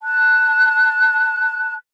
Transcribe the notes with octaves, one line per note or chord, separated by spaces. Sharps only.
A5 F#6